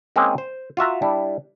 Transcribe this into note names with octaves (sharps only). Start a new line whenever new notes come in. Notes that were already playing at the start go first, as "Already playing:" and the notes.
G#3 A#3 C4 C#4 D#4 G#4
C5
F4 F#4 E5 A#5
G3 D4 E4